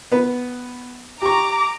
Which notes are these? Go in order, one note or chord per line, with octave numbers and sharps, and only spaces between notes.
B3 B4
G4 A#5 C#6 D6